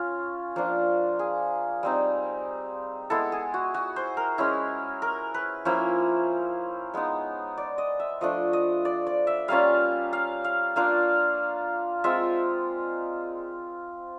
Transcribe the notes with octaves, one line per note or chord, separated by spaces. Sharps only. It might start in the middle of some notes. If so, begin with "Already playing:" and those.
Already playing: C#4 F4
F3 A#3 D4 F4
G#4
G3 C4 D#4
G#3 B3 E4 A4
G#4
F#4
F#4
C5
A#4
G#3 C#4 E4
A#4
B4
F3 A#3 C#4 E4 C5
G#3 B3 D#4
D5
D#5
E5
F3 A3 D4 D#5
D#5
D5
D5
E5
G3 A#3 C#4 F4 F5
F5
F5
A#3 D4 F4 F5
G#3 C4 F4 E5